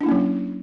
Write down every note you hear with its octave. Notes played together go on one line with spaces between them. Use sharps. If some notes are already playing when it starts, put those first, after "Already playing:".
F#3 A#3 C#4 D4 E4